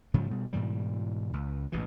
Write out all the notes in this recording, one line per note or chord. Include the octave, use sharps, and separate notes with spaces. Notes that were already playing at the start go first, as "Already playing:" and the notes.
G#2 C#3 F3 F#3
B2 G3
G#2 B2 E3 G3
C#2
A1 G#2 B2 E3